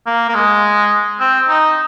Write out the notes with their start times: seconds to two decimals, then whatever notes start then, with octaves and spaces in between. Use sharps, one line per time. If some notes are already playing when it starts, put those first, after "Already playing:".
0.06 A#3
0.29 A#3
0.35 G#3
1.20 C4
1.49 D#4